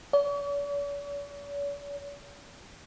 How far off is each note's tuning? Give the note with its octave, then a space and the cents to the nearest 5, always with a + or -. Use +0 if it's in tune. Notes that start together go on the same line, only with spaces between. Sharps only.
C#5 +45